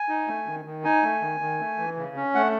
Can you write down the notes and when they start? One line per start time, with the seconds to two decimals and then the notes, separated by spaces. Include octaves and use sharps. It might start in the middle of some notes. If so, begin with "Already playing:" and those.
Already playing: G#5
0.09 D#4
0.28 A3
0.46 D#3
0.65 D#3
0.84 D#4 G#5
1.03 A3
1.22 D#3
1.41 D#3
1.59 A3
1.78 E3
1.97 C#3
2.16 C#4
2.35 A3 F#5